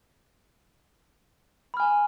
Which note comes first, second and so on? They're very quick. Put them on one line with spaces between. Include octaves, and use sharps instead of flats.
B5 F6 G#5